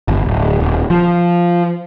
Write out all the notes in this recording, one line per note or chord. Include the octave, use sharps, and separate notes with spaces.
G1
D1
D#1
F3